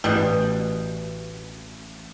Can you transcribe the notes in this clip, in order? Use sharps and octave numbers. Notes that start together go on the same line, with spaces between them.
A1 B2 G3